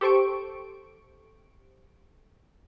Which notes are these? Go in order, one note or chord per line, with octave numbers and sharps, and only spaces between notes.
G4 A4 C5 C#6 D7